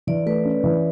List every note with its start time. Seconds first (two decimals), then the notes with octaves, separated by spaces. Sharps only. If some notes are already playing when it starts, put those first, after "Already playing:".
0.07 E3 D5
0.26 A3 B4
0.45 C#4
0.64 E3